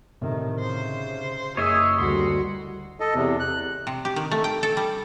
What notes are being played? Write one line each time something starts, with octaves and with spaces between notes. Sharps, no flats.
A2 C3 D#3
C#3 C5
F#1 G#4 C#5 D#5 E5
D2 G3 F#4 C6
A4 D#5
E2 C3
F#6
C3
G4
D#3
A3
G5
A4
G3